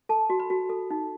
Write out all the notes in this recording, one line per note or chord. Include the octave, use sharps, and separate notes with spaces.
A4 A5
F#4
B5
F#4
A4
D#4